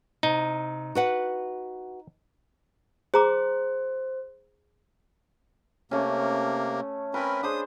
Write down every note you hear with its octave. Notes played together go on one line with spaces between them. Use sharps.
C3 D#4
F#4 B4 F#5
G#4 C5 A#5 D6
C3 A3 A#3 C#4
C4 C#4 A#4 B4 B5
D4 G#4 C5 D#6